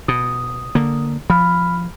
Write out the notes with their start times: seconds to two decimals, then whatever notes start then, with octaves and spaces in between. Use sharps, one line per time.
0.08 B2 D#6
0.75 D3 A#3
1.30 F3 B5 F6